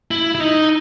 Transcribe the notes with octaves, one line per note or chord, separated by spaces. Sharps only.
E4
E4
D#4